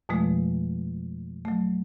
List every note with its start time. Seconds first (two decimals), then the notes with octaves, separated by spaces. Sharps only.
0.09 F2 B2 F3 G#3 A3
1.45 F#3 A3